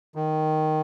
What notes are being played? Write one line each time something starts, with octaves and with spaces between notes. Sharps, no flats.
D#3